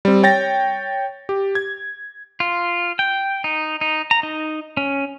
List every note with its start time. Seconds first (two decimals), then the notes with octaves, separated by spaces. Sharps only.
0.05 G3 C4
0.23 C#5 G5 A6 A#6
1.29 G4
1.55 G#6
2.40 F4
2.99 G5
3.44 D#4
3.81 D#4
4.11 A#5
4.23 D#4
4.77 C#4